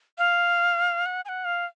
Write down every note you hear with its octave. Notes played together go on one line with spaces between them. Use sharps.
F5
F#5
G#5
F#5
F5